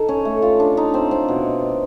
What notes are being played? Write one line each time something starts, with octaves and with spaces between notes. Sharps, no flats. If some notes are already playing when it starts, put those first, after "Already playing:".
Already playing: D#4 A4
C#4
A3
F4
D4
D#4
C4
C4
B2